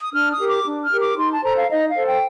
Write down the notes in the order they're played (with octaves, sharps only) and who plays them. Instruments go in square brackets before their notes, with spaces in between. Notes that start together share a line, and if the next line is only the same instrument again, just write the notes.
[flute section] D#6
D4 F6
D#6
G4 A#4
D6
D4
F6
G4 A#4
D6
D#4 C6
A5
A4 C5 A#5
F5
D#4 D#5
F5
A4 C5
G5